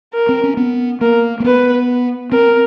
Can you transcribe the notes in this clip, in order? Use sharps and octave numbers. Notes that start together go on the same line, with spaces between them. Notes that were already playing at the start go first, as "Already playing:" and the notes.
A#4
C4
C#4
B3
A#3 A#4
A#3
B3 B4
C4 A#4